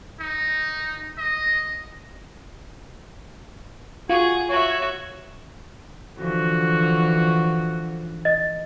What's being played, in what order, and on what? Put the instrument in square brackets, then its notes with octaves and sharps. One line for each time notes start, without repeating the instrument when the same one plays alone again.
[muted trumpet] D#4
D#5
[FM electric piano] F4 [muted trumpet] F#4 [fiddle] G#4 [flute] G#6
[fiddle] F#4 E5 [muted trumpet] C#5
[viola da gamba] D3 E3 F3 [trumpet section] F#4
[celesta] D#5 A6